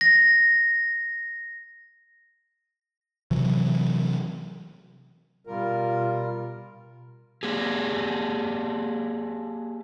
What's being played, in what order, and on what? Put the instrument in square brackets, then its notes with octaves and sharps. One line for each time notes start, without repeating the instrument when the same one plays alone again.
[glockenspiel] A#6
[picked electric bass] C3 E3 F#3
[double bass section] B2 [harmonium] G3 A#4 [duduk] F4
[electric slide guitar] A#3 G4 G#4